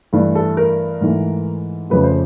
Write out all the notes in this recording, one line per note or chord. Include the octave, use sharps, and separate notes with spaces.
G2 E3 A3
A4
A#4
G#2 E3 A3
F2 C#3 F3 A3 B4
C5